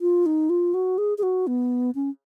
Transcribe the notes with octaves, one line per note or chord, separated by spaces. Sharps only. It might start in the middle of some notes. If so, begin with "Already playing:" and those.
F4
D#4
F4
F#4
G#4
G#4
F#4
B3
C#4